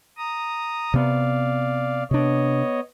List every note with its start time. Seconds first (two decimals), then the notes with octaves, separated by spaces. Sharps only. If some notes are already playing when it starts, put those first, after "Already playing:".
0.17 A#5 D#6
0.94 C3 B3 D5 F5
2.11 C3 B3 D4 C#5 D#5